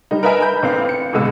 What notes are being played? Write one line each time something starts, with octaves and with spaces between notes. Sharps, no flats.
G3 D#4
A#4 B4 D#5 E5 G#5
B5 G6
A1 C4 B4 F5
C#7
G1 C#2 B2 G#3 E6